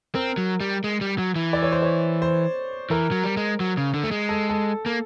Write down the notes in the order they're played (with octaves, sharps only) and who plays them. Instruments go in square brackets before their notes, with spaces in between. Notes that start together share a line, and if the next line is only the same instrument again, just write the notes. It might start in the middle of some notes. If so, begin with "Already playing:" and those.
[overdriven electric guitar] C4 [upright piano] A#4
[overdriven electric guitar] F#3
G3
G#3
G3
F#3
E3
[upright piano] D5
C#5
C5
C#5
C5
[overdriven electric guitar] E3 [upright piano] A#4
[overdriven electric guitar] F#3
G3
G#3
F#3
C#3
D3
A3
G#3
[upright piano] A4
A4
[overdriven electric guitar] A#3